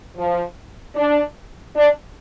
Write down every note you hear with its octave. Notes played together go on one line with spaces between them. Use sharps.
F3
D4
D4